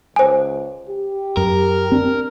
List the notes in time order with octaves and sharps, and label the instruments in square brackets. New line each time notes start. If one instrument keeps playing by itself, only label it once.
[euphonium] C#2 [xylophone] C5 G#5
[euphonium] G4
[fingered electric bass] F#2 [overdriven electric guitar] A#4
[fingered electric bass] C4 [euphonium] D4